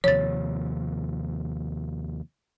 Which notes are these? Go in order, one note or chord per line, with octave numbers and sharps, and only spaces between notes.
D#2 C3 F3 C#5 A6